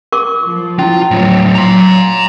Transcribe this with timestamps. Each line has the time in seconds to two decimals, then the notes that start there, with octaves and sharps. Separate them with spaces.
0.12 A#4 C#6 D6
0.44 F3
0.79 C#4 E4 F4
1.11 A2 F#3
1.55 F#3 A#5 C6